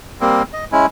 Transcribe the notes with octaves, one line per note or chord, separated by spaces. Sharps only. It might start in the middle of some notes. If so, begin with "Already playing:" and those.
G3 A#3 C4
D#5
G#3 C#4 E4